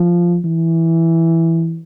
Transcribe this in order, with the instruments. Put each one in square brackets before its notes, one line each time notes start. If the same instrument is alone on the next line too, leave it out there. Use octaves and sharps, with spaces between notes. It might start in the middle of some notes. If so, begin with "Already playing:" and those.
Already playing: [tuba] F3
E3